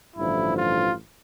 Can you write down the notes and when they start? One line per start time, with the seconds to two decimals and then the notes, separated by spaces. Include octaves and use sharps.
0.15 A1 G2 D3 F3 E4
0.56 F4